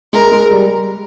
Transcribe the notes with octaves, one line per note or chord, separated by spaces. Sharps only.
G#3 A#4
G#3
G3